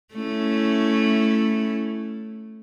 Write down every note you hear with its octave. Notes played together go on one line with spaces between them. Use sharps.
A3 C#4 E4